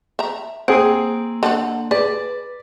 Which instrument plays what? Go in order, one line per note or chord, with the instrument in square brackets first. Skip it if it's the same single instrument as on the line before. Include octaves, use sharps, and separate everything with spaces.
[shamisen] E5 A#5
[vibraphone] A#3 [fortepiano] C4 G#4 [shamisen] F#5
[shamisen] D3 A4 F#5
[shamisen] G#4 [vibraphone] B4 [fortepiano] D5